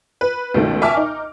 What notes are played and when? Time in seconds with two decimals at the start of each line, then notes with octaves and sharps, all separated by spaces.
0.21 B4
0.54 C#2 B2 D#3 A3
0.82 E5 G#5 A5 C#6 D6 F6
0.97 D#4